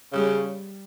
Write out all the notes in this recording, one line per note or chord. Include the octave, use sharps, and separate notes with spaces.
C#3 G3